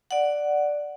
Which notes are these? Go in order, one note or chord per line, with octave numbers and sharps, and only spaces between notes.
D5 F#5